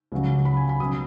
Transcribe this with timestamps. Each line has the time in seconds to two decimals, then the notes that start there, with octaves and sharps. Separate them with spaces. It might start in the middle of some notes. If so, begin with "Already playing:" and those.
0.12 C#2 C#3 F#3 C#4
0.45 B5
0.57 G#5
0.69 B5
0.80 B2 F#3 C#4 D#6